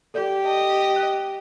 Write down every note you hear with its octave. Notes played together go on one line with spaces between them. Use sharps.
G4 A4 D5 G6
D#5 A5
F#6